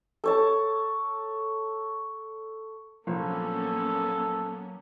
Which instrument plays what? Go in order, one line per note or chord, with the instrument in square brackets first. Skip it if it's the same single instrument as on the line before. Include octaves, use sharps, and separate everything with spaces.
[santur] A4 C#5 A5
[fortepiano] A#1 [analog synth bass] F#3 [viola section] A#3 B3 C#4 [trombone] A4